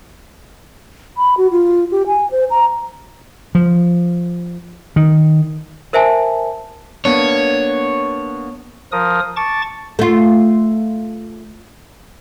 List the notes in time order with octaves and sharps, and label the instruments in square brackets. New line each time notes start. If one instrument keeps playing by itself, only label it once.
[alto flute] B5
F#4
F4
G4
G#5
C5
A#5
[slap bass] F3
D#3
[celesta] A#4 C5 E5 G#5 A5
[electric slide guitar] A#3 B3 D4 [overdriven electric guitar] C#5
[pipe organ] F3 A#4 D#6
A5 C#6 D6 A6
[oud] A3 F4